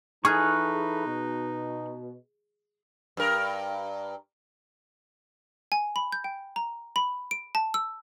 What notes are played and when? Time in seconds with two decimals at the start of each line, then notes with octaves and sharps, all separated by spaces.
0.25 E3 D#4 G#4 A4 B5 C#6 F6 F#6
1.06 B2
3.17 G2 A#4
5.72 G#5
5.96 B5
6.12 G6
6.24 G5
6.56 A#5
6.96 B5
7.31 D7
7.55 A5
7.74 E6